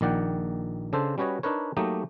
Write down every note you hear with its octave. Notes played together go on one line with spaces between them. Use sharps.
A#1 D#3 D5 F#5 G5
C#3 D4 A4 C5
G3 C#4 F#4 B4 C#5 D#5
D4 D#4 A#4 B4 C#5
F#3 A3 A#3 D#4 G4 D#5